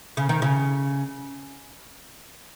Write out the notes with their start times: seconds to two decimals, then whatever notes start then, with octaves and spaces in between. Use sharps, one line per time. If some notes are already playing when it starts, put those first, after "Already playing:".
0.17 C#3
0.29 D#3
0.42 C#3